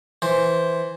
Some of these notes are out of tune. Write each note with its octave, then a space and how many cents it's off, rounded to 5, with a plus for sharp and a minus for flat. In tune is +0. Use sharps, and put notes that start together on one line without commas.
E3 +0 C5 +0